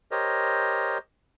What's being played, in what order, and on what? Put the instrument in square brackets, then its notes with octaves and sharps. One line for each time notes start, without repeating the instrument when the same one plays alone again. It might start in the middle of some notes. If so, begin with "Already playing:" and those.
[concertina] G4 A#4 C5 C#5 D#5